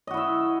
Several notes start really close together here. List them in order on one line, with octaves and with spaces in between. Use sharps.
D#5 F#4 E4 E5